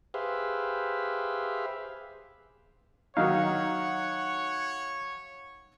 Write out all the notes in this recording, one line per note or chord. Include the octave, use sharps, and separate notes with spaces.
G4 G#4 B4 C5 E5 F5
D#3 F#3 D#4 C#5 F5 F#5